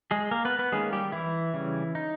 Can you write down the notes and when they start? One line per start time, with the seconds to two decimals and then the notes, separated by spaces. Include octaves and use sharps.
0.11 G#3 G#4
0.31 A#3 A#4
0.45 B3 B4
0.59 B3 B4
0.72 D#3 G#3 A#3 C#4 G#4
0.93 G3 G4
1.12 E3 E4
1.54 C#3 G3 C#4
1.95 D#4